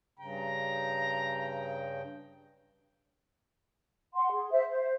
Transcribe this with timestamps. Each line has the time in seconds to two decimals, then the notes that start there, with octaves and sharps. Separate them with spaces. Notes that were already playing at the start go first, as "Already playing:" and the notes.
0.19 G2 C#3 G5 A#5
4.15 F#5 C6
4.33 G#4
4.51 C5 E5
4.69 C5